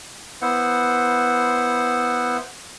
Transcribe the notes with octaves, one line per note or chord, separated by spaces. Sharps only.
B3 E4 C5 F#5